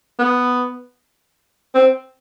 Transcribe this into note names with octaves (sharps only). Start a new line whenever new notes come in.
B3
C4